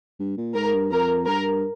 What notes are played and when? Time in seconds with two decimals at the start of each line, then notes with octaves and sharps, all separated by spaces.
0.19 G2
0.37 A#2
0.55 G#2 A#4
0.73 G2
0.91 F2 A#4
1.27 G2 A#4